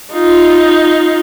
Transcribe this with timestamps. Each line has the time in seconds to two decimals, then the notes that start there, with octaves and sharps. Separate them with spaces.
0.13 D#4 F4